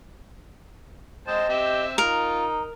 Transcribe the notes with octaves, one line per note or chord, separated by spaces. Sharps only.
G#3 C5 D#5 G5 A5
C4 G4 E5
D#4 F4 A#4 A#5